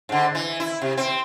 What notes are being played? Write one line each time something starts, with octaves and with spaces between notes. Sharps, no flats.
G#2 D3
E3
E4
C3
C4